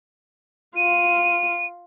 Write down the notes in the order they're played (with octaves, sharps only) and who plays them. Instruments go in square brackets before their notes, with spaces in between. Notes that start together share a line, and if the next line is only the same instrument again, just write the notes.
[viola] F4 [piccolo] D#7